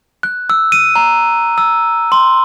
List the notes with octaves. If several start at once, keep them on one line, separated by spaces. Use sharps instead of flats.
F#6
E6
D#7
A#5
E6
C6